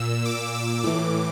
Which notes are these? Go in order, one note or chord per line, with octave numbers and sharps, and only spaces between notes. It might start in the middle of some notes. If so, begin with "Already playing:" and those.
Already playing: A#2 E6
D6
E6
A2 E3 D6